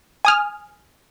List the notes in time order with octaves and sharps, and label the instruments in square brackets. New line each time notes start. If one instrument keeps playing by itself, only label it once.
[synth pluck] G#5 D#6 F6